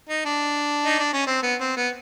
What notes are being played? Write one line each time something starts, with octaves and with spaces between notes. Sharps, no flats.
D#4
D4
D#4
D4
C#4
C4
B3
C4
B3